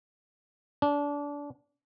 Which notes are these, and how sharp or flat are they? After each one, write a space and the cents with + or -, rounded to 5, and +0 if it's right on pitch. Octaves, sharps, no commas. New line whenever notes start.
D4 -25